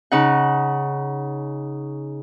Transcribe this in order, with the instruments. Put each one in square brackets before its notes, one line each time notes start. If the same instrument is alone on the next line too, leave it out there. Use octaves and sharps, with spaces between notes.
[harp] C#3 D#4 F#5